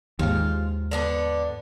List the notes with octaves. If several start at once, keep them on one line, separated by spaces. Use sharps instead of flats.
D#2 G#2 F4
D3 B3 D4